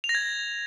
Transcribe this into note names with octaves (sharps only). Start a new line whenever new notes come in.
F7
A#6
G#6